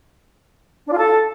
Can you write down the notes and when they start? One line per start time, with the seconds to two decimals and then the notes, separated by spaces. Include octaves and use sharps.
0.86 D4
0.92 F4
0.98 A4